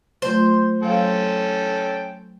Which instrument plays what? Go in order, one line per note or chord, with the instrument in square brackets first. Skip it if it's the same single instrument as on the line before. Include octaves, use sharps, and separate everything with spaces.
[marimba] F#3 A3 F4 [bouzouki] C5
[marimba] F#3 F5 [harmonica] C#4 A4 G5